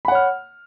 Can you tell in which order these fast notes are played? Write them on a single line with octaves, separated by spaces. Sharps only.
B5 F#5 C#5 F6